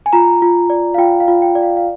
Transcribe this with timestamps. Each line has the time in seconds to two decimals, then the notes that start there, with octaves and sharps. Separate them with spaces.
0.06 G#5
0.13 F4 A#5
0.42 F4
0.70 D5
0.94 F5
0.98 F4 G5
1.20 F5
1.28 F4
1.42 G5
1.55 D5
1.63 F5
1.77 F5